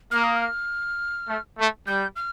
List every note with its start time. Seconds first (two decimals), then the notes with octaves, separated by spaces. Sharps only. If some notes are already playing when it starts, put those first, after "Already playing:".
0.11 A#3 F6
0.24 D#6
0.36 F6
1.28 A3
1.58 A3
1.87 G3 G6
2.16 F6